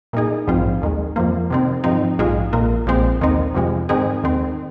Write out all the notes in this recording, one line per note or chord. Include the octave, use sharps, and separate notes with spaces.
A#2 A#3 D#4 G#4
A#1 G#2 F3 C4 F4
D#2 D#3 G#3
F2 F3 A#3
C3 D#3 C4
G#2 F3 C4 D#4
A#1 G#2 G#3 F4 G#4
A#1 A#2 A#3
A#1 A#2 G#3 C4
D#2 D#3 C4 D#4
F2 C3 F3 G#3
G#2 D#3 G#3 C4 G#4
D#2 D#3 C4